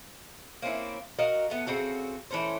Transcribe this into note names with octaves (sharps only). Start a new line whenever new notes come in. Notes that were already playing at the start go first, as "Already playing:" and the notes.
A#3 C4 C#4 E4
F#4 A#4 D#5 F5
A3 B3
C#3 C4 F#4 A4
E3 A3 C#4 C5